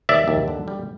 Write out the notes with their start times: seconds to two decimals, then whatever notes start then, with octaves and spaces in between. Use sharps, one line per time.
0.09 D#2 D5 E5
0.28 D#2
0.48 D3
0.68 G3